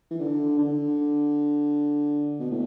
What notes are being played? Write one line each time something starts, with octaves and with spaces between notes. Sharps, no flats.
E3
D3
D3
B2
A2